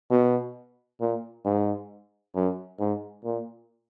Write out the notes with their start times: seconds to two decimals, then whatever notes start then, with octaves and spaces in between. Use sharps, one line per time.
0.11 B2
1.01 A#2
1.45 G#2
2.35 F#2
2.80 G#2
3.25 A#2